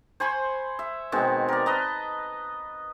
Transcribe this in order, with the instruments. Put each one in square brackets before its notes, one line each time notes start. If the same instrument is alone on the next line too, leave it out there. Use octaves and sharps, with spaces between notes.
[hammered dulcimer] C5 G#5 B5 C#6
E5
B2 D#3 G#3 C4
A#4 D5
B4 D#5 A5 A#5